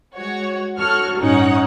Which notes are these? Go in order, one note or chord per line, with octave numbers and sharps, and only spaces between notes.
G#3 F#4 C#5
F#4 A4 C#5 C#6 F6
A1 G2 C#4 D#4 C#5 F#5